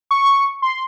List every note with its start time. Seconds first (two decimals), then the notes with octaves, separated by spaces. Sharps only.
0.11 C#6
0.62 C6